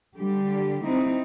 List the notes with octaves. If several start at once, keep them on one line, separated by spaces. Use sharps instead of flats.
D3 G3 G4
C4 D#4 E4